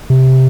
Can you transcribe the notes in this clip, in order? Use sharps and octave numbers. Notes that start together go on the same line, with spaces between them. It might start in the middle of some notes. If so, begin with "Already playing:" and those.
C3